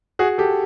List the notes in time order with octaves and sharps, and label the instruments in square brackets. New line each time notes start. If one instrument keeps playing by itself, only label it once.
[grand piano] F#4 G#4
G4 A4